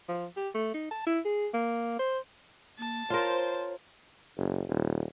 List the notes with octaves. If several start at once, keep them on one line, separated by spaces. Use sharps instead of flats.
F3
G4
A3
D#4
A5
E4
G#4
A#3
C5
A#3 A5
F4 A#4 C5 C#5
F#1
D#1